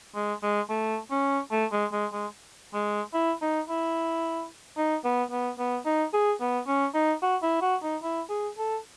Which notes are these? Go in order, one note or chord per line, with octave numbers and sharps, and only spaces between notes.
G#3
G#3
A3
C#4
A3
G#3
G#3
G#3
G#3
E4
D#4
E4
D#4
B3
B3
B3
D#4
G#4
B3
C#4
D#4
F#4
E4
F#4
D#4
E4
G#4
A4